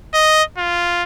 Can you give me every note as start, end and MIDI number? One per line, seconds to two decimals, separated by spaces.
0.14 0.43 75
0.58 1.04 65